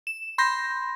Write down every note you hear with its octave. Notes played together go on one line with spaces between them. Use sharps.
E7
B5 C6 G6 A#6